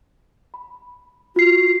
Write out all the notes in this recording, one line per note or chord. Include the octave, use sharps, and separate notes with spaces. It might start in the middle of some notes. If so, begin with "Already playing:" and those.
B5
F4 F#4 C7